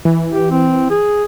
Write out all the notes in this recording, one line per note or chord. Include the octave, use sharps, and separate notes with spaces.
E3
G4
C4
G#4